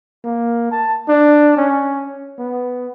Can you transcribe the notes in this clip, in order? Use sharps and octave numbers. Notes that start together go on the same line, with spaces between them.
A#3
A5
D4
C#4
B3